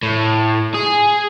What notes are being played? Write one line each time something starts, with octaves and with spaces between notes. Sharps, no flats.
A2
G#4